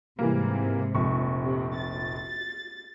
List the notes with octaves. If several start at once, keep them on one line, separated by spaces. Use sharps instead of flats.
G#2 C3 E3 G3 A#3
F1 A#1 C#6
C3
A6